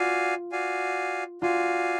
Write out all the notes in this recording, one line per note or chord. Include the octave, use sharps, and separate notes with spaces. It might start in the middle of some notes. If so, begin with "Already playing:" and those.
Already playing: F4 F#4 D5 F5 G#5
F#4 D5 F5 G#5
F4 F#4 D5 F5 G#5